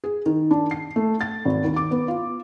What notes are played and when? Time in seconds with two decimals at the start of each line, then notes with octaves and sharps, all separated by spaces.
0.04 G#4
0.26 D#3
0.51 D4
0.71 C7
0.96 A3
1.21 A6
1.45 G#1
1.64 D#2
1.76 D6
1.91 B3
2.08 F4